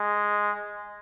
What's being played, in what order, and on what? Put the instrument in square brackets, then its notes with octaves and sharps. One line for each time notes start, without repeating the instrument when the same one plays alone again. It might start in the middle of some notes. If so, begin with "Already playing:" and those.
Already playing: [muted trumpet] G#3